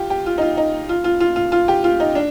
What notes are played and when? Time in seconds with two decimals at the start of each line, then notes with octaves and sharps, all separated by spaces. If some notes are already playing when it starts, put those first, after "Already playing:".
Already playing: F4 G4
0.10 G4
0.26 F4
0.38 D#4
0.42 F4
0.57 D#4
0.89 F4
1.04 F4
1.20 F4
1.36 F4
1.52 F4
1.68 G4
1.84 F4
2.00 D#4
2.15 D4